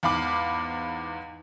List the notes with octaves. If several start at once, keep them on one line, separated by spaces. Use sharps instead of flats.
E2 G#2 F5 B5 D6